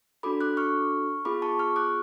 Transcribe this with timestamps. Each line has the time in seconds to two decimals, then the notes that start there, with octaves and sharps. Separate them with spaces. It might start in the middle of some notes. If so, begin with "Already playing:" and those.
0.23 D4 F#4 A4 B5 D6
0.41 D6 F#6
0.57 C#6 F6
1.25 B3 F4 G#4 B5 D6
1.42 A5 C#6
1.59 C#6 F6
1.76 D6 F#6